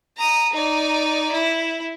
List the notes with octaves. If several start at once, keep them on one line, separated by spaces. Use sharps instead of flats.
A#5 D#6
D#4 D5
E4